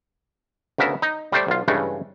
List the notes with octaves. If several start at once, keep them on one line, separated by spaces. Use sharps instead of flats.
D2 C#3 B3 A#4 E5
D#4
G3 A3 C5 D5
B1 F4
G2 C#3 E3 G#3 A3